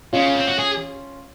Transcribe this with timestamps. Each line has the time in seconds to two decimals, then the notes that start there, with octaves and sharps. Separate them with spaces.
0.13 C#3 C#4 F4
0.35 C4
0.47 F#4
0.59 G#4